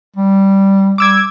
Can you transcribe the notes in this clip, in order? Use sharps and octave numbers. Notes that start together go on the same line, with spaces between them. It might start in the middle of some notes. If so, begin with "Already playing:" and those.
G3
G3 D6 E6 G#6